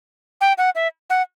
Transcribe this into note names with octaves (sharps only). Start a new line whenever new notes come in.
G5
F#5
E5
F#5